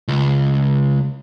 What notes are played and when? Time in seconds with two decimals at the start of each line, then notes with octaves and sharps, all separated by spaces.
0.08 C#2